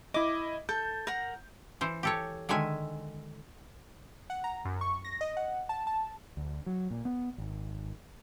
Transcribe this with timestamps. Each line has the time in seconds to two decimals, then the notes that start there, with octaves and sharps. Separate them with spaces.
0.14 E4 D#5 D6
0.69 A4 G6
1.07 A#4 F#5 A#5
1.81 E3 C5
2.03 G4 A4 C#5
2.49 D3 D#3 G#3 E5 G#5
4.30 F#5
4.44 A#5
4.65 F#2
4.81 C#6
5.05 A#6
5.21 D#5
5.37 F#5
5.69 A5
5.87 A5
6.37 D2
6.66 F#3
6.91 A#2
7.05 B3
7.38 G#1